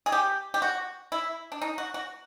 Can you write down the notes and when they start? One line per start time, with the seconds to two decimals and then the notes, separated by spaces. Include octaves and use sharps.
0.06 G#4
0.12 G4
0.54 G4
0.62 F#4
1.12 E4
1.52 D4
1.62 D#4
1.78 F#4
1.94 F#4